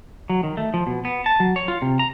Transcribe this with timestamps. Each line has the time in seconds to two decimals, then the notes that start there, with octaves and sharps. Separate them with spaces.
0.30 F#3
0.43 D#3
0.57 A3
0.74 F3
0.87 B2
1.05 B3
1.26 A5
1.40 F#3
1.56 C#5
1.68 F4
1.82 C3
1.99 A#5